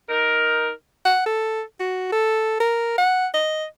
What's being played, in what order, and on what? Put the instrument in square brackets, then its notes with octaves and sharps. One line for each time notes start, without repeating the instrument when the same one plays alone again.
[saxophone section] D#4 A#4
[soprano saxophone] F#5
A4
F#4
A4
A#4
F#5
D#5